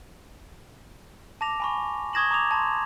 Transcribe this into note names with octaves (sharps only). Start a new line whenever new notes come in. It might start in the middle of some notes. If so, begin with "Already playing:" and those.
A5 D6 A#6 F7
G#5 B5 C#6
C#6 D#6 G#6 A#6 E7 F#7
A#5 D6 D#6 F7
A5 C6